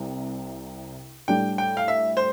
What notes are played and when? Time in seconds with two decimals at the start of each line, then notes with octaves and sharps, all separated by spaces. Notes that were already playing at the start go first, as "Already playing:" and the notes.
Already playing: C2 C3
1.28 A2 G3 D4 G5
1.58 G5
1.77 F5
1.88 E5
2.17 C5